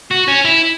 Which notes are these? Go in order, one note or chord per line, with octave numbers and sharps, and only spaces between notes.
F#4
C#4
E4